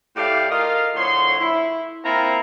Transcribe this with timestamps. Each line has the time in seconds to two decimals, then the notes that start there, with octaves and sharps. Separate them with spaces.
0.16 A2 A3 G4 D5 F5
0.50 F4 A#4 D#5 F5
0.95 A2 D3 F3 C#5 C6
1.39 E4
2.04 A#3 C4 E4 F4 A#5